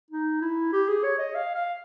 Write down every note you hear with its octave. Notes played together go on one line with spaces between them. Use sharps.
D#4
E4
G4
G#4
C#5
D#5
F5
F5